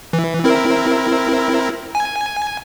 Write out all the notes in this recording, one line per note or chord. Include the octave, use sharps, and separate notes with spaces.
E3
C4 E4 A#4
G#5